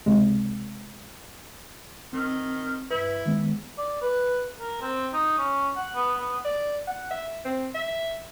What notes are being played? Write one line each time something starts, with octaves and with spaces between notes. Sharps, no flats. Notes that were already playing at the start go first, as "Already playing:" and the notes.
C#2 C3 G#3
D#3 C4 E6
G2 E4 B4
D#3 G#3 B3
D5
B4
A#4
C4
D#4
C#4
F#5
B3
B3
D5
F#5
E5
C4
E5